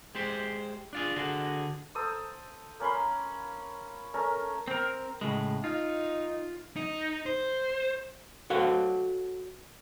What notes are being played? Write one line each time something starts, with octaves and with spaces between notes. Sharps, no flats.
G#3 G4 C5
D4 F4 G#4
D3 F#4 G#4
A4 C5 D#6 E6
A#3 C#4 B5 C6
A3 C#4 A#4
C4 A#4
A2 C#3 G#3
D#4 F4
D#4
C5
F#4 A4 C#5 F5